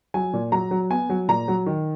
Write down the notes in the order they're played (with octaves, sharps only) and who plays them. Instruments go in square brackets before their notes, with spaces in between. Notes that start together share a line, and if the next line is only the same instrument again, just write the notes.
[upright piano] F#3 G#5
A#2
F#3 A#5
F#3
B3 G#5
F#3
A#2 A#5
F#3
D#3